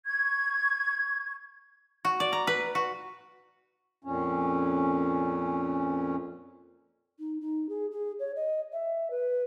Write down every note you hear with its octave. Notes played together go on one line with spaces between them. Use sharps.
C#6 G#6
F#4
D5
A#5
B4
F#4
F2 A#2 C#4
D#4
D#4
G#4
G#4
C#5
D#5
E5
B4